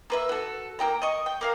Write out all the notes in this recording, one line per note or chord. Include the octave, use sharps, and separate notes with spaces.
A#3 B4 E5
F#4 A4
A#3 D#4 G5 A#5
D#5 C#6
G5
A#3 A#4 F5